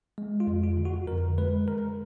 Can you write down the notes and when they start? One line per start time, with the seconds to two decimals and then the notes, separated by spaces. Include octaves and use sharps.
0.18 G#3
0.40 F4
0.47 F2
0.63 F4
0.77 D3
0.85 F#4
1.07 F2 A#4
1.38 G#3 B4
1.68 D3 A#4